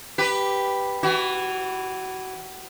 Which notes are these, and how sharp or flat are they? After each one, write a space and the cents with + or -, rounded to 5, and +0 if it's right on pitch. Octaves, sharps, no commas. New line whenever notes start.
G4 +0 B4 +0
E3 +0 F#4 +25